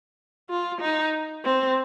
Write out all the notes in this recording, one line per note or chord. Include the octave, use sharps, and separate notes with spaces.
F4
D#4
C4